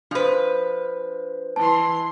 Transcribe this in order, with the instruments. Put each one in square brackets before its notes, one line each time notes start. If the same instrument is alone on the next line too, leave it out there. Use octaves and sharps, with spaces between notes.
[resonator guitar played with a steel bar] F3 B4 [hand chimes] D4 C5
[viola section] E3 C6 [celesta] A5